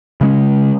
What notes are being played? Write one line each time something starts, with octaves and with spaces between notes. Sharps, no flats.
C#3 G#3 C#4